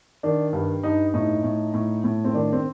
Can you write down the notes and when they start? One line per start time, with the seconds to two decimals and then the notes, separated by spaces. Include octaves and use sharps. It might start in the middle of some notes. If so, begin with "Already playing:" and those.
0.23 D#3 D4
0.53 G2
0.83 G2 D#4
1.14 A2 D#4
1.44 A2
1.74 A2
2.04 A2
2.25 C4
2.33 D#3 D4
2.52 C4